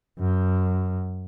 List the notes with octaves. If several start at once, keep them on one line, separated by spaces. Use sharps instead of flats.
F#2